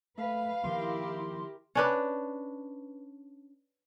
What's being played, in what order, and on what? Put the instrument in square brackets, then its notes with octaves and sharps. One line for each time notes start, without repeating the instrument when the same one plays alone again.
[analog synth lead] A3 [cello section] B4 [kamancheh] F5
[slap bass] D#3 F3 A#3 [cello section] E4 G4 A#4 [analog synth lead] C6
[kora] C#4 D4 B4